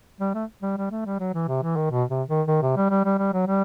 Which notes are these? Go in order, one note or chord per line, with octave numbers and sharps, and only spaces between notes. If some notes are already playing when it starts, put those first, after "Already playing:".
G3
A3
G3
G3
A3
G3
F#3
E3
C3
E3
D#3
B2
C3
D#3
D#3
C3
G3
G3
G3
G3
F#3
G3